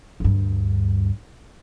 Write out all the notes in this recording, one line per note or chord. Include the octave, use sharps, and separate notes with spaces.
D2 G2